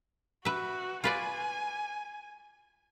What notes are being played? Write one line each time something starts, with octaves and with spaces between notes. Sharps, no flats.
F#4 B4 E5
F4 B4 D5 G#5